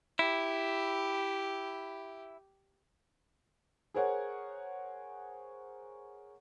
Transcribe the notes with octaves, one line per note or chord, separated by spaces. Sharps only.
E4 G4
G#4 A#4 C5 C#5 F#5